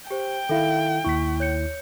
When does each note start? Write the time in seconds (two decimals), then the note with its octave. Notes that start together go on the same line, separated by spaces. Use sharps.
0.11 G4 C5 G5
0.49 D#3 E4 A4 E5 F5
1.05 D#2 E4 C#6 B6
1.40 C#5 G6 C#7